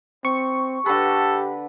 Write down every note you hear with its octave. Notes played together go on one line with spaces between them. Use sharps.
C4 C#6
D3 G4 A4 B4